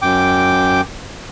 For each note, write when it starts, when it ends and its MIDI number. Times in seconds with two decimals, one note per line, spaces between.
0.02 0.81 42
0.02 0.81 79
0.02 0.81 86